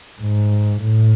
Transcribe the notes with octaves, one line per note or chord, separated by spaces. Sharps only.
G#2
A2